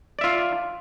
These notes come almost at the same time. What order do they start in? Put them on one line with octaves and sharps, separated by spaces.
D5 E5 F4